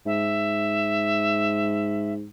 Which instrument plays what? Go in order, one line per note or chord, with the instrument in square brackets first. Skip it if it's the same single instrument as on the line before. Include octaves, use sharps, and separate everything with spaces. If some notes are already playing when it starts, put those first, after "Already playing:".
[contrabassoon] G#2 [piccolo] E5